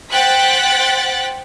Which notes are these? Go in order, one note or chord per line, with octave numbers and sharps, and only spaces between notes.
C5 F#5 G5 F#6 A6 B6